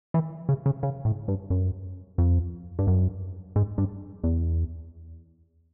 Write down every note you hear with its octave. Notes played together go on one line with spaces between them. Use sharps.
E3
C#3
C#3
C#3
A2
G2
F#2
F2
G2
F#2
G#2
G2
E2